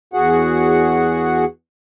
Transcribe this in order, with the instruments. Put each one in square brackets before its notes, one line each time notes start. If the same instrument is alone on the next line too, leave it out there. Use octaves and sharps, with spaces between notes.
[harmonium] E2 F#4 G#4 F#5